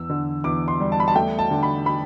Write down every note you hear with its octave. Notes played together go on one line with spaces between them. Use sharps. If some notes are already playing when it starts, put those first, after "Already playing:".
Already playing: E2 E6
D3
E2 D6
C6
G3
A5
B5
A5
A3 G5
A5
D3
B5
B5